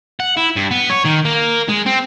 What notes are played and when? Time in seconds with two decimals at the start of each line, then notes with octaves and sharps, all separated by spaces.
0.20 F#5
0.37 E4
0.56 G2
0.71 B3
0.90 C#5
1.05 D#3
1.25 A#3
1.69 G#3
1.86 C4